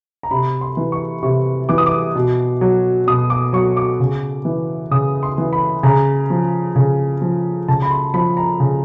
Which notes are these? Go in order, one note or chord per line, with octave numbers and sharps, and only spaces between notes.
A#5
C3 B5
C6
E3
C#6
C3 C#6
E3 D6
D#6
D6
B2
F#3
B2 D#6
D6
F#3 C#6
D6
C#3
E3
C#3 D#6
C6
E3
B5
C#3 A#5
F3
C#3
F3
C#3 A5
B5
C6
F3 B5
A#5
C#3